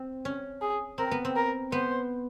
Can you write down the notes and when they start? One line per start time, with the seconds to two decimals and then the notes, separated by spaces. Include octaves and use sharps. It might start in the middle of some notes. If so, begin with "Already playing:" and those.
Already playing: C4
0.25 C#4
0.61 G#4
0.98 C4 A#4
1.11 B3
1.25 C4
1.36 A#4
1.72 B3 C5